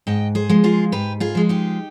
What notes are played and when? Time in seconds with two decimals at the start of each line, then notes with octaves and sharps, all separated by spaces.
0.07 G#2 D#5 G5
0.35 G#4 C5
0.49 F3 G#3
0.64 F4 G#4
0.92 G#2 G4 B4
1.20 F4 G#4
1.35 F3 G#3
1.49 D#4 G4